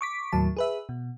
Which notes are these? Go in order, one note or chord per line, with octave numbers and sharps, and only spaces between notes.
C#6 D6 B6
D#2 A2 F#3 A5
G#4 B4 E5
B2